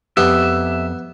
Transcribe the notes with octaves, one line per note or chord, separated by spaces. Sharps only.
F2 B3 G4 E5